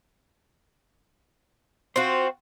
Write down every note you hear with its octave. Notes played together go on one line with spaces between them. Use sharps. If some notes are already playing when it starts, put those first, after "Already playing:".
C4 F4 F#4 C5